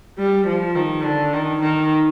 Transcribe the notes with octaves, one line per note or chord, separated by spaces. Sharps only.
G3
F3
D#3
D3
D#3
D#3